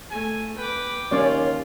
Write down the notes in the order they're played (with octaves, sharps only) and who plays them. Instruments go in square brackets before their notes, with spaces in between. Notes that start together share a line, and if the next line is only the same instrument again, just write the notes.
[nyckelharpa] A3 [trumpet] G#5
[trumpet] B4 [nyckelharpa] G5 D6
[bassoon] D#2 [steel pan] C#4 C#5 D5 [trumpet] F4